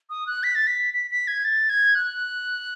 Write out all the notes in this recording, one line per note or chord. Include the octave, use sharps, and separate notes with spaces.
D#6
F#6
B6
A6
B6
B6
B6
G#6
A6
G#6
F#6